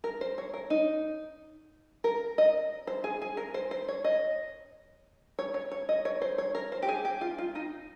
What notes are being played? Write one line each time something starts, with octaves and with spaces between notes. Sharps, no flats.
A#4
C5
C#5
A#4
D#4
A#4
D#5
C5
G#4
G#4
A#4
C5
C5
C#5
D#5
C#5
C#5
C#5
D#5
C#5
C5
C#5
A#4
C5
G4
G#4
G4
F4
F4
D#4